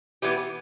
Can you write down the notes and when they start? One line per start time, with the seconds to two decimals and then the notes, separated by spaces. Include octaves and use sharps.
0.22 E3 B3 E4 G4